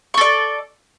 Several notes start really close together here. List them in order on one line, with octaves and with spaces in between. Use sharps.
C#6 A4 D5